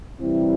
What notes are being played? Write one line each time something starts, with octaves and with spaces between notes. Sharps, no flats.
C3 E3 G3 C4 E4